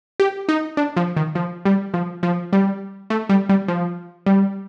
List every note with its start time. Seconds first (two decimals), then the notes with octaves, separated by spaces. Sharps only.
0.20 G4
0.49 D#4
0.77 D4
0.97 F3
1.17 D#3
1.35 F3
1.65 G3
1.94 F3
2.23 F3
2.53 G3
3.10 A3
3.29 G3
3.49 G3
3.68 F3
4.26 G3